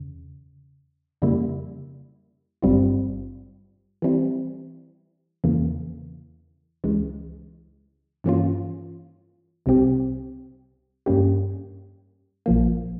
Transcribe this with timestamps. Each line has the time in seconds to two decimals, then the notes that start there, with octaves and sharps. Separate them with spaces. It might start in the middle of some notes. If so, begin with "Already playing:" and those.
Already playing: E2 C#3
1.22 F2 C#3 G3 A#3 E4
2.62 G#1 G2 G3 C4 F4
4.02 E3 G3 C4 E4
5.44 E2 C#3 E3 A#3
6.84 C#2 C#3 E3 G#3
8.24 G2 E3 A#3 C#4 F4
9.66 C2 C3 G3 C4 G4
11.06 G2 G3 A#3 C#4 G4
12.46 A#1 A#2 F3 A#3